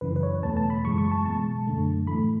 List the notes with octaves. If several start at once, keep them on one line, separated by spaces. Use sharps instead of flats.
F#2 C#3 E3 B4
B4
C#5
E2 B2 A3 A5
A5
B5
F#2 C#3 E3 G#3 C#6
C#6
A5
B2 G#3 A5
F#2 D3 A3
A2 E3 A3 B5